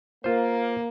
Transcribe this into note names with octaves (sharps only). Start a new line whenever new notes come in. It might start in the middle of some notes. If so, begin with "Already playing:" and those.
A#3 F4 C5